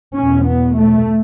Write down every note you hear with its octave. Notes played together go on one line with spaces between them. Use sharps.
E2 B2 C#4
B3
A3